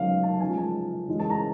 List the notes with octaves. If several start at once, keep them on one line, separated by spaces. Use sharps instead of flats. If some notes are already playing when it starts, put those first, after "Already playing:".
Already playing: C#3 F#3 F5
A5
C#3 F3 G#3 G#5
A5
C#3 E3 G#3
A5
A#5